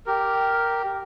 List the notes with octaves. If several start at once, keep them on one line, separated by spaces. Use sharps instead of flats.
G4 A#4